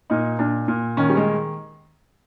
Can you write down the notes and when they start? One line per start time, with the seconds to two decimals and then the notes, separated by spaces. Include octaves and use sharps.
0.10 A#2 D#4
0.39 A#2 D4
0.68 A#2
0.97 D#3 C#4
1.10 G3
1.17 G#3